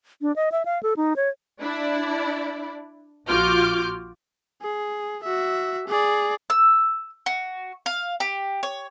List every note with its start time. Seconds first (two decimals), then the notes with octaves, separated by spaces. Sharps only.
0.22 D4
0.36 D#5
0.52 E5
0.65 F5
0.83 A4
0.97 D#4
1.16 C#5
1.62 D4 E4 D5
3.28 A#1 F4 F#4 D6 F6 G6
4.62 G#4
5.23 F#4 E5
5.88 G#4 D5
6.50 E6
7.26 F#4
7.86 F5
8.20 G4
8.63 C#5